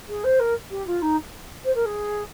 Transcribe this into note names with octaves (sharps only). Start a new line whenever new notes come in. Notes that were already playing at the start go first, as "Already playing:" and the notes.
G#4
C5
A#4
G4
F4
D#4
C5
A#4
G#4